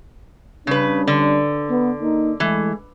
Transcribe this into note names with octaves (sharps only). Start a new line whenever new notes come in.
C#3 G3 C#4 D4 B4
D3
B3
A#3 D#4
E3 G#3 A3